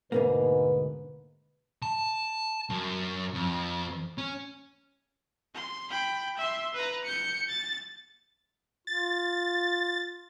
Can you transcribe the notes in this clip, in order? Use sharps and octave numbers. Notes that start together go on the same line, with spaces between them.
D2 G#2 B2 A#3 B4
A5
F#2
F2
C#4
C6
G5 B5
E5 C6
B4 A#5
G6 C#7
A6
F4 A6